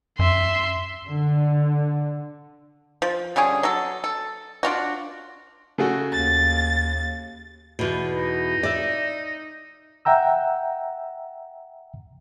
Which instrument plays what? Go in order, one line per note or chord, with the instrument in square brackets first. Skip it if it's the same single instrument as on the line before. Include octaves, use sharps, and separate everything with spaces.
[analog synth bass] F#2 [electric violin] E5 C6
[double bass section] D3
[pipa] F3
D3 G3 C#4 G#4
F#3 A4
A4
D4 F4 F#4
[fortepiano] C#3 A3 F#4
[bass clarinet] D#2 [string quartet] A6
[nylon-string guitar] E2 B2
[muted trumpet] D#4
[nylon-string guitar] D5 E5
[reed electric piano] E5 F#5 G5 A#5 E6